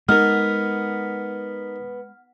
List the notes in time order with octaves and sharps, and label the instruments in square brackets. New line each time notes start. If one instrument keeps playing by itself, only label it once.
[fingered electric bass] G#3 [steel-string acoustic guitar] B3 [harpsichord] D#4 A#4 [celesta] F6